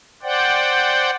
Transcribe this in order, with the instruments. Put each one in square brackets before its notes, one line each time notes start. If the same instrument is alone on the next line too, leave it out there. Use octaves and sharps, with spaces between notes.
[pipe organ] C5 D5 F#5 G5